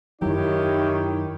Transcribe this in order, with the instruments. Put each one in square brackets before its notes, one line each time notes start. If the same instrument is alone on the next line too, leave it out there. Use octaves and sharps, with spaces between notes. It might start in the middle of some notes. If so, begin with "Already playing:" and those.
[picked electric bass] F#2 F#3 [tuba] D#3 [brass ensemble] D#4 E4 C#5 [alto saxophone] G4